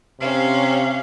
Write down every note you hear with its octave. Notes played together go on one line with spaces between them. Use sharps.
C3 C#4 F5